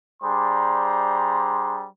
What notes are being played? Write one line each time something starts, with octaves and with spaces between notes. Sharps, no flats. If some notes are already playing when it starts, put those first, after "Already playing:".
G3 D4 G#4 C5 A#5 C6